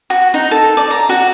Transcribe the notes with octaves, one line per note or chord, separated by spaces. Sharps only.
F#4
D#4
A4
D5
A#5
F#4